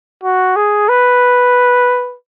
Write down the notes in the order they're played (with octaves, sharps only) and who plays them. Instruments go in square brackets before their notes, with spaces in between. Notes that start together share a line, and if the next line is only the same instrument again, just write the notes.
[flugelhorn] F#4
G#4
B4